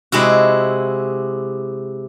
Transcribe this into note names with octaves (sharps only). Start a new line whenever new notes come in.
C3 G#3 E4 F#4